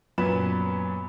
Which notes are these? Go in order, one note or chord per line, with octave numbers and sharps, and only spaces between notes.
F#2 A#2 B3 B4 B5 E7